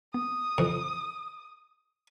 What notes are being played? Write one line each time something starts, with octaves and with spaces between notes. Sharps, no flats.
B3 D#6
F2 C#3 E3